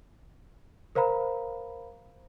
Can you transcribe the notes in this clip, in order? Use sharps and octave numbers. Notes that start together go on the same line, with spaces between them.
A#4 C5 F5 A#5 B5